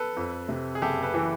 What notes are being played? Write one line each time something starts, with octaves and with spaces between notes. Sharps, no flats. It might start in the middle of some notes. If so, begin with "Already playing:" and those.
Already playing: A4 B4
F2
C3
G#4
F#1 G4 A4
A4 B4
E3